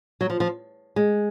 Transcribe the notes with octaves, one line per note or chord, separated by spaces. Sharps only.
F#3
F3
F3
G#3